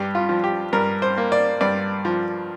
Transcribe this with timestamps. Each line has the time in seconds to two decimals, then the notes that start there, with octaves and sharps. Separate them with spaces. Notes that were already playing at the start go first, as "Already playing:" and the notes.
Already playing: G2 G4
0.15 F4
0.29 F3
0.44 G4
0.73 G2 A#4
1.02 C5
1.17 A#3
1.32 D5
1.61 G2 D5
2.05 F3